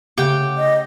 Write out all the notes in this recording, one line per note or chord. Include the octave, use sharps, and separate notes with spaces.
C#3 A3 G4 F#5 G5
D#5